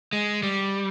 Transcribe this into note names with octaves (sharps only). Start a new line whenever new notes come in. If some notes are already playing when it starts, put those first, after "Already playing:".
G#3
G3